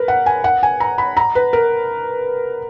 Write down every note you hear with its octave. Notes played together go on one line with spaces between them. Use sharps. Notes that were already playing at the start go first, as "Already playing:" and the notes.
Already playing: A#4 B4
F#5
G#5
F#5
G#5
A#5
B5
A#5
B4
A#4